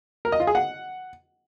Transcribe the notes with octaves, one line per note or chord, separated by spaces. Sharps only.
A#4
D#5
F4
G#4
F#5